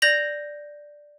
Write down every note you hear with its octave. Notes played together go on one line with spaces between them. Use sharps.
D5 G6 A#6 F7 F#7